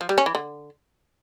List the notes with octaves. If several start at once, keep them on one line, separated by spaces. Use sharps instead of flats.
F3
G3
C#4
E3
D3